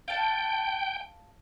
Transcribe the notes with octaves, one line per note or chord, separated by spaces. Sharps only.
F5 G5 A5